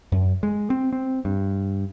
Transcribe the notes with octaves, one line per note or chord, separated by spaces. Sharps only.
F#2
G#3
C4
C4
G2